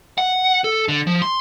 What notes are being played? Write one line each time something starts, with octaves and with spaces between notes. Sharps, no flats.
F#5
A4
D3
F3
C6